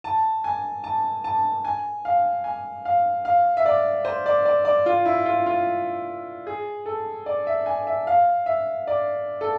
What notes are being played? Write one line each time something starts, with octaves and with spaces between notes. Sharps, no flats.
A5
G#5
A5
A5
G#5
F5
G#5
F5
F5
E5
D5
C5
D5
D5
D5
F4
E4
F4
F4
G#4
A4
D5
E5
G#5
E5
F5
E5
D5
A4